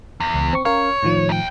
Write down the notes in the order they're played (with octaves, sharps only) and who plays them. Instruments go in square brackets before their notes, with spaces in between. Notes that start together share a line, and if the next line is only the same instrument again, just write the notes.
[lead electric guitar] E2
[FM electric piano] C#2
C4 C#6
[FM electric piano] C#4 A#4 F5 [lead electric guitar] C#5
[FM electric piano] A2 D#3 F3
[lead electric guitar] D#2 G5